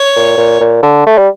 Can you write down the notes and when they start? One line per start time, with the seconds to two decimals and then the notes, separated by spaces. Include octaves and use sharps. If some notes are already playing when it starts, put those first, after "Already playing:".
Already playing: C#5
0.16 A#2
0.38 A#2
0.61 A#2
0.83 D3
1.06 A3
1.18 G3